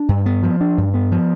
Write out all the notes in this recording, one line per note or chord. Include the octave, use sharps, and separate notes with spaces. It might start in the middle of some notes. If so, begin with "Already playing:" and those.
Already playing: D4
G2
B3
F3
D4
G2
B3
F3